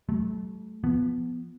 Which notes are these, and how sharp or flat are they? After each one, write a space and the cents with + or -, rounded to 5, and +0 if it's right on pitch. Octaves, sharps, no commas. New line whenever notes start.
F#3 +30 A3 -25
F3 +0 B3 +0